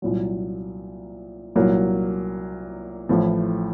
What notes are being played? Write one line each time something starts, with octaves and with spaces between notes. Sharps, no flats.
C2 A#2 F#3
C2 A#2 F#3 A#3
A1 A2 F3